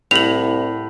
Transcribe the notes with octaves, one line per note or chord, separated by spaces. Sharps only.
C2 A2 F7 F#7